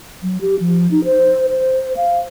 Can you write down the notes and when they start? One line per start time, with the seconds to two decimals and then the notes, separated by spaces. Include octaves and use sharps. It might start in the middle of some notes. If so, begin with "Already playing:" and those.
0.23 F#3
0.41 G4
0.60 F3
0.91 D#4
1.05 C5
1.49 C5
1.97 F5